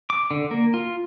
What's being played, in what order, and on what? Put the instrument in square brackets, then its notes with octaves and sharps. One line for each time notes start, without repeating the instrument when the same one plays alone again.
[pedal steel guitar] D6
D3
A#3
F4